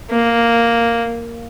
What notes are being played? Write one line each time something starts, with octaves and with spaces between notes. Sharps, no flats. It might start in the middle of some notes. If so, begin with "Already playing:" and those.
A#3